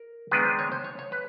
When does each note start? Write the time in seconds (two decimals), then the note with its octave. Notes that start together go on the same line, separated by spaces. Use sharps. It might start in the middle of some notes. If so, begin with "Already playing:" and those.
Already playing: A#4
0.31 D#3 G#3 B3 D4 B4
0.45 C5
0.59 C#5
0.72 C5
0.84 C#5
0.99 C#5
1.12 B4